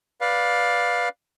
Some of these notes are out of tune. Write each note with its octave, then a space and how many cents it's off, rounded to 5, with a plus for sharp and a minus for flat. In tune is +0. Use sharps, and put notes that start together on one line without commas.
B4 +0 D5 +0 F5 +15